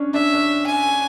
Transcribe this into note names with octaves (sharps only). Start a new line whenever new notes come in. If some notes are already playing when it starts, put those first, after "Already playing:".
Already playing: C#4 D4
D4 E5
D4
G#5